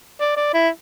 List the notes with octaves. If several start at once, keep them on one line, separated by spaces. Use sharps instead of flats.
D5
D5
E4